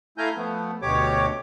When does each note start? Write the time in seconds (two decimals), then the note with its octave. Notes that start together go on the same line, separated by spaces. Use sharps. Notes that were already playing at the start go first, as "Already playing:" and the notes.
0.18 A3 E4 F5 G#5 A#5 G6
0.37 F3 A3 B3
0.82 D2 B2 G4 C#5 D6